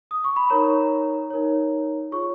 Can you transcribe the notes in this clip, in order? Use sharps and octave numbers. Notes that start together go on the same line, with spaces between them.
D#6
C#6
B5
D#4 A#4 C#5 A#5
D#4 A#4 C#5
F4 G#4 C#5 C#6